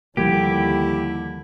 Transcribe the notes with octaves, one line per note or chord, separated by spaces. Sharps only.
D#2 D3 F3 G3 A#3 E4 G4